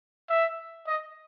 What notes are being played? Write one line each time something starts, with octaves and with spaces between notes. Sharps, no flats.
E5
D#5